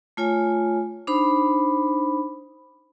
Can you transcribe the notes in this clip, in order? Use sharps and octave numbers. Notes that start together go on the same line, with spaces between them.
A3 F4 C#5 G#5
D4 D#4 C5 B5